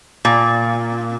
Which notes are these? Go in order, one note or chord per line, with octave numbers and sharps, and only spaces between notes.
A#2